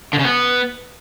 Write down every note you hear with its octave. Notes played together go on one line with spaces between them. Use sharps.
D3
C#3
B3